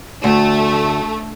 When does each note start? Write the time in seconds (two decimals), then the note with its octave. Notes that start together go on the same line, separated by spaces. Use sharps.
0.24 D2 A3